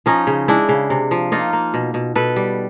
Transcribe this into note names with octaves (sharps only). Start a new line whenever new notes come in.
F3 C#4 D#4
C#3
G#3 D4 E4
C#3
C3
F3
A#3 D#4 F4
A#3
B2
B2
B2 A4 B4
G3